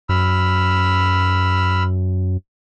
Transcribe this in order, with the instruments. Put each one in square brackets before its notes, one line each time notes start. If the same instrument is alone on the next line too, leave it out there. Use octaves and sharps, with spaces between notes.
[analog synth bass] F#2 [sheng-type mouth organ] B5 E6 F6